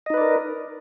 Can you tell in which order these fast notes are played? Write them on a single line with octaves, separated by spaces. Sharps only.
D#5 D#4 B4 D5 A#4